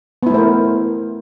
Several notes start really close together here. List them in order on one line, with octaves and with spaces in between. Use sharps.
B3 E4 A3 C5 A#4